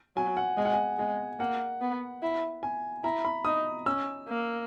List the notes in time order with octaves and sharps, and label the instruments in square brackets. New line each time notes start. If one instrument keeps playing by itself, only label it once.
[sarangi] F#3 [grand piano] G#5
[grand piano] F#5
[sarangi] G#3 [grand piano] G#5
[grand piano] F#5
G#5
[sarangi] G#3 [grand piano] G#5
[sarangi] A#3 [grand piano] F#5
[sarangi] B3
E4
[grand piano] G#5
[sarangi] E4 [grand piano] A#5
[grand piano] B5
[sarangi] D#4 [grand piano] D#6
[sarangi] C#4 [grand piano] E6
[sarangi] A#3